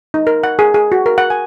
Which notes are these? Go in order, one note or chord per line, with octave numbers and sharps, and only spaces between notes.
D#4
A#4
F#5
G#4
G#4
F#4
A#4
F#5
G#5